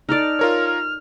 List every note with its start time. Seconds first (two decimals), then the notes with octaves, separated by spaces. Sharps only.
0.09 D#4 A4 D5 F6
0.39 F4 A#4 C#5